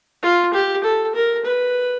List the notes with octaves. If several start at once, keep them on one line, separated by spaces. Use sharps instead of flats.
F4
G4
A4
A#4
B4